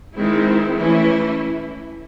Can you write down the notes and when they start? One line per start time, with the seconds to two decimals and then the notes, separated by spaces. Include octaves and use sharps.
0.15 D#3 G#3 C4 E4
0.76 E3 A3 C#4 E4